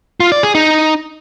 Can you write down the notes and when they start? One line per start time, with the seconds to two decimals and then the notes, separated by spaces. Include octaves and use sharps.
0.20 F4
0.32 D5
0.43 G#4
0.55 D#4